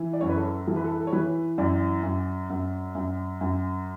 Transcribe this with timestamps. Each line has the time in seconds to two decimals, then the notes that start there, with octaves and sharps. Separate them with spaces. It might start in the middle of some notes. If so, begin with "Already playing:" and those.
Already playing: E3
0.13 D5
0.21 F#2 C#5
0.29 B4
0.37 A4
0.67 E3 A4
0.76 B4
0.84 A4
0.92 B4
1.00 A4
1.07 C#5
1.13 E3 B4
1.58 F#2 D5
2.03 F#2
2.50 F#2
2.95 F#2
3.41 F#2